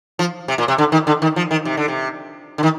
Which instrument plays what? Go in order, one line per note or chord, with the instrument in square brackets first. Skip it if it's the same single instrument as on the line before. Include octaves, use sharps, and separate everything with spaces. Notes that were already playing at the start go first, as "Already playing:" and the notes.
[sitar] F3
C3
A#2
C3
D3
D#3
D3
D#3
F3
D#3
C3
D3
C3
D3
D#3